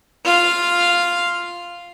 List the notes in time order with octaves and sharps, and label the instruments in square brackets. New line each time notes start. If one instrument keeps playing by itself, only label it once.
[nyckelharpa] F4 F5